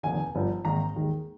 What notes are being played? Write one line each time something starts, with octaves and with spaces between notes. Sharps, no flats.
F1 D#2 D3 G#5
G1 G2 D3 F3
G#1 G#2 D#3 A#3 A#5
D#2 D#3 G#3